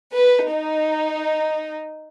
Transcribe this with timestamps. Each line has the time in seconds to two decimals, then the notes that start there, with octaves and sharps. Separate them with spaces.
0.13 B4
0.49 D#4